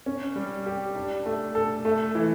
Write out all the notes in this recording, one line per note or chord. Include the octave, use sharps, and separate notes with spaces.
C#4
G3
G4
D4
A3
A4
A3
E3